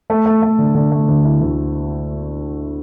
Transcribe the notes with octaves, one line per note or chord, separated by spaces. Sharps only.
A3
A3
A3
D3
D3
A3
D2
E4
D2